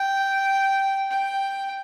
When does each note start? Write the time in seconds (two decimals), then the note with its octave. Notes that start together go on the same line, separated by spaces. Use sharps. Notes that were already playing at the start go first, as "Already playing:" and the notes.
Already playing: G5
1.11 G5